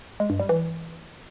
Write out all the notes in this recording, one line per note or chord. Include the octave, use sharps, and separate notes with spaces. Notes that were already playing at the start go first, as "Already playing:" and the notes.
G#3
G2
G3
E3